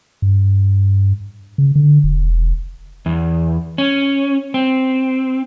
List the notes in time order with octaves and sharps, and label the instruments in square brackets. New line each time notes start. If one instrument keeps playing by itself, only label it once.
[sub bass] G2
C#3
D3
E1
[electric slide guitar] E2
C#4
C4